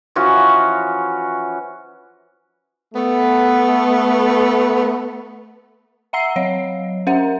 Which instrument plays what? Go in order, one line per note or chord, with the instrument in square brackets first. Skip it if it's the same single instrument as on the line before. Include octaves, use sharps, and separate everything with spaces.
[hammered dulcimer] E3 F3 C#4 F#4
[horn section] A3 B3
[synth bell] E5 F#5 A#5 E6 C7
F#3 C#5 D#5 F5
C#4 A#4 C5 E5 F#5